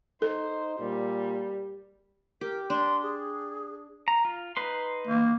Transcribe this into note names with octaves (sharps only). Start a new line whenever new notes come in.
D#4 A4 C5
A#2 G3
G4 A#4
D4 C6
G#4
A#5
F4
D#4 B4 C6
A#3